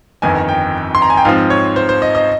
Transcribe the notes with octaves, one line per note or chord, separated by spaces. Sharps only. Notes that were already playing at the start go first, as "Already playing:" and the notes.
G1 F2 D#3 G#5
G5
C6
A#5
G#5
G5
G#2 F3 C4 F5
C#5
C5
C5
D#5
D#5